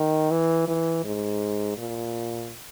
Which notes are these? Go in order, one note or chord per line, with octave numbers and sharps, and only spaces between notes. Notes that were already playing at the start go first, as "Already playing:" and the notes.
Already playing: D#3
E3
E3
G#2
A#2